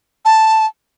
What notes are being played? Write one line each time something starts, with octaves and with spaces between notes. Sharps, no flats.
A5